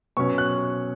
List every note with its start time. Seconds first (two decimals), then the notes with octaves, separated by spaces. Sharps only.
0.17 B2 F#3 C#4 C#6
0.38 F#6